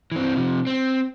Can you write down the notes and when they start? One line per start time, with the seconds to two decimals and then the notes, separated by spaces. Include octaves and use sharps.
0.12 E3 C4
0.36 C3 F3
0.67 C4